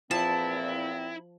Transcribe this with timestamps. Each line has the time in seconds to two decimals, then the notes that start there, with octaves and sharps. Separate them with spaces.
0.11 E2 A#2 F3 C4 E4 A5